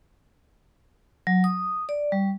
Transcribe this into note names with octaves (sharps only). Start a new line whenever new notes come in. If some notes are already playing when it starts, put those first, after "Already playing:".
F#3
D#6
D5
G3